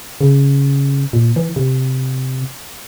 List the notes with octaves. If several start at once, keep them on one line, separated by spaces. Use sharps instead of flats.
C#3
A#2
E3
C3